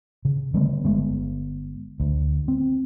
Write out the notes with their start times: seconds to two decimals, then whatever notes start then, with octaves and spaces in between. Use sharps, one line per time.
0.25 C#3
0.54 D3 G3 A3 B3
0.85 G1 G#3 B3
2.00 D2
2.48 C4